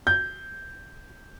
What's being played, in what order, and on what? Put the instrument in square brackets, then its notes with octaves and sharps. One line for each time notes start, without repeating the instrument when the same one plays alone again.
[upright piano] G6